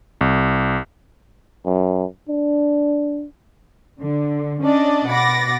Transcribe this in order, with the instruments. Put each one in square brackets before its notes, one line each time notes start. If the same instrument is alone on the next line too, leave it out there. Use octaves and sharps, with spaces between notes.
[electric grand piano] C2
[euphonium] F#2
D4
[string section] D3
C#4 D4 D5 D#5
B2 F#5 B5 D6 A6 A#6